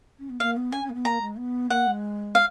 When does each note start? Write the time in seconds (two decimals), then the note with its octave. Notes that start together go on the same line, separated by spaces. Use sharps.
0.18 C#4
0.29 B3
0.40 A#3 F5
0.56 B3
0.72 C#4 G#5
0.84 C#4
0.89 A#3
0.94 B3
1.05 A#3 A#5
1.21 G#3
1.38 B3
1.70 A#3 F#5
1.87 G#3
2.35 F5